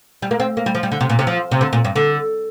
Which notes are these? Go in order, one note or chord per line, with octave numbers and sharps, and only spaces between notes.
G3
A#3
C4
A#3
G3
F3
G3
D3
C3
A#2
C3
F3
C3
D3
A#2
G2
D3